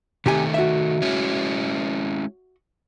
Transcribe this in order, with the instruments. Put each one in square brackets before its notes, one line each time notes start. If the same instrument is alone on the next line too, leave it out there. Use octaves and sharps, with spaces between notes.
[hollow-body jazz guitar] C3 G4 G#5 [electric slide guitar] D#3 A3
[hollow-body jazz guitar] F#4 E5
[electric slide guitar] G#3 C#4 E4